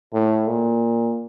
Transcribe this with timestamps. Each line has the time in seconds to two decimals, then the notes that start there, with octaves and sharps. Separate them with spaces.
0.14 A2
0.47 A#2